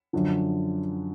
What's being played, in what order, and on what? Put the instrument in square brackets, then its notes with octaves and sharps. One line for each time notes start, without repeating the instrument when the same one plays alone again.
[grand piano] F#2 D3 F3